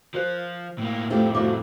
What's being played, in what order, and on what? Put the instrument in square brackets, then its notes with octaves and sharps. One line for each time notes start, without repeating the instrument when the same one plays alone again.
[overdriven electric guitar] F3 [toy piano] F4 A#4 C5
[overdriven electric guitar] A2 A#3
[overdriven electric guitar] F2 A2 [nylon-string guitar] F3 A3 G4
[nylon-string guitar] F3 A3 F#4 [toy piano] A4 D6